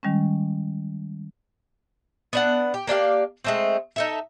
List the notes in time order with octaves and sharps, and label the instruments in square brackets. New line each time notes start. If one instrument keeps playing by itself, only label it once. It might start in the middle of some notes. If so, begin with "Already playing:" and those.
[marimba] D#3 G3 G#3 C#4
[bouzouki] B3 D4 F#5
G4
A#3 D4 G4 F5
G#3 A3 C4
D#4 A4 E5